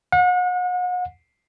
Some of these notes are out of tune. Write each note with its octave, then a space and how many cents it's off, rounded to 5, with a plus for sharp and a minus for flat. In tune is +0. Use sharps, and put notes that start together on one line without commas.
F#5 -40